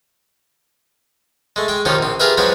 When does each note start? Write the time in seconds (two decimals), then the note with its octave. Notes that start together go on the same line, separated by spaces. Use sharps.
1.56 G#3 A3
1.68 G#3 G5
1.85 D#3 F3 C#4 G4
1.99 A#1 C4
2.20 F4 G4 G#4 A#4 B4 E5
2.37 F3 F#3 G#3 C4 B4